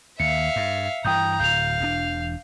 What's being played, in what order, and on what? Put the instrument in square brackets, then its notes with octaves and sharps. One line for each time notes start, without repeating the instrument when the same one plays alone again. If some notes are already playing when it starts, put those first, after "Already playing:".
[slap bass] D#2 [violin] E5 F5 [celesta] C#7
[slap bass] G2
[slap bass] G2 E3 [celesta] G5 D#6 G6 [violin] A#5
[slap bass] D1 [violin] F5 [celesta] G6 F7
[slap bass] E1 A2 D4